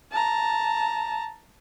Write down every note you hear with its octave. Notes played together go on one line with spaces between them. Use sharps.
A5 A#5